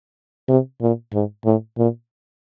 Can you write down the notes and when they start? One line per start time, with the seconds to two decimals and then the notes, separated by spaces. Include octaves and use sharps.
0.48 C3
0.81 A#2
1.13 G#2
1.45 A2
1.77 A#2